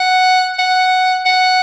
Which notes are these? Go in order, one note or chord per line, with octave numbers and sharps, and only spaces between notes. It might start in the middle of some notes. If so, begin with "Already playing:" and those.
Already playing: F#5
F#5
F#5